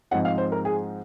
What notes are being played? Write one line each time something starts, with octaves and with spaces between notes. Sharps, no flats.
G#2 F3 G#3 C4 D#4 F#5
F5
C5
A#4
G#4